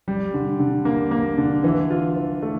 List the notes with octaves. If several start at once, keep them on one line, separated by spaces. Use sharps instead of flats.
G3
D3
D3
A#3
A#3
D3
E3
F4
E3
A3